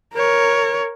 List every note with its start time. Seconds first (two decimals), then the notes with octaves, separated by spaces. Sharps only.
0.15 A#4 C#5